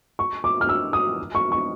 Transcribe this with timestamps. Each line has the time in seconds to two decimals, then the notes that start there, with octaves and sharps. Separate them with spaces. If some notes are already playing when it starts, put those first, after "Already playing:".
0.19 C#6
0.44 D6
0.61 F6
0.69 E6
0.93 D#6
1.35 C#6
1.52 C#6